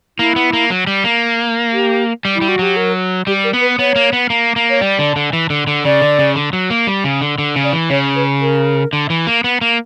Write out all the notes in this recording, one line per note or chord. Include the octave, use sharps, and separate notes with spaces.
A#3 E4
B3
A#3
F#3
G3
A#3
G4
G3
E4
G3
F#4
F#3 G4
A#4
G3 G4
A#4
B3
B4
B3 C#5
A#3
B3
A#3
A#3
C#5
G3 D5
D3
D3
E3
D3
D3
C#3 D5
D3
C#3
D3
F#3
A#3
G3
C#3
D3
D3
C#3
D5
E3
C#3 C#5
B4
A#4
D3
E3
A#3
B3
A#3